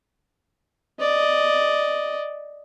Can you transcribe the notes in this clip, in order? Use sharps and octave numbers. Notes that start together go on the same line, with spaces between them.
D5 D#5